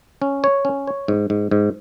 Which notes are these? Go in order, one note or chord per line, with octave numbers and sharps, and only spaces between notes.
C#4
C#5
C#4
C#5
G#2
G#2
G#2